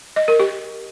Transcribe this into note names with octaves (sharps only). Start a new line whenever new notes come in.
D#5
A#4
G4